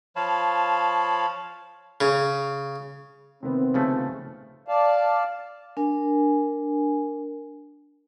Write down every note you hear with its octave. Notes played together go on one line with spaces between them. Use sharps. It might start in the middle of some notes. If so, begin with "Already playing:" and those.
F3 C#5 F5 A5 B5
C#3
C3 D#3 B3 C4
C#3 F3 A3
D5 F5 A5
D4 A#4 G#5